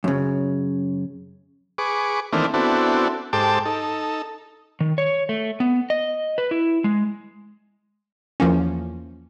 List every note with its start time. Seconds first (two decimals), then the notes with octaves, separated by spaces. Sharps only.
0.04 F#2 C#3
1.78 G#4 B4 C#6 D6
2.33 D#3 E3 A3 A#3 C4 D4
2.54 B3 C4 D4 E4 F#4 A4
3.33 G#2 G4 A4 C5 A5 D6
3.65 D#4 A4
4.81 D#3
4.98 C#5
5.29 A3
5.60 B3
5.90 D#5
6.38 B4
6.51 E4
6.84 G#3
8.40 E2 F3 A#3 C#4